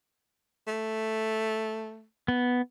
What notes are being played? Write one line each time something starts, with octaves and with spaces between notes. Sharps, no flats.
A3
B3